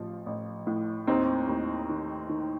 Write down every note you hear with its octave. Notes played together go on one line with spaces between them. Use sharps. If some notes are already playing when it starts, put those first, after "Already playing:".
Already playing: A1 F3
A1
A2
D#2 C4 D#4
D#2
D#3
D#3